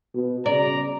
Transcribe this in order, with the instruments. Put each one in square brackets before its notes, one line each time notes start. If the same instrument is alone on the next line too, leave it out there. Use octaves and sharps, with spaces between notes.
[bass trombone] B2
[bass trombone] C#3 [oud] D5 [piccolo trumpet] A#5